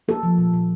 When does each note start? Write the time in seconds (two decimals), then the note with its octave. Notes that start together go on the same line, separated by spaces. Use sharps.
0.08 A#3 A4
0.23 F3
0.38 A#2
0.54 A#2